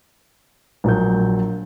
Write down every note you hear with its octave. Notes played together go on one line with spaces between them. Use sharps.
A#1 F#3 A#3 G6